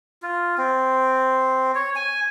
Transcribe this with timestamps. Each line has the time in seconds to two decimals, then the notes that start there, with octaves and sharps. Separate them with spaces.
0.22 F4
0.58 C4
1.75 C#5
1.95 G#5